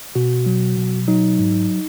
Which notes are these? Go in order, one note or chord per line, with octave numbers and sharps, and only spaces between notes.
B2 F#4
F#3
B2
F#3 D#4
G#2